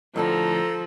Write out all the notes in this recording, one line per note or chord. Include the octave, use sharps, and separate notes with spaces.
F2 A2 D3 F3 A4 A#5